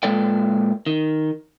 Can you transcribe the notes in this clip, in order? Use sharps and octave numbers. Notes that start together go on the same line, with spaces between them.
A#2 G#3 A4 B4 D5 G5
D#3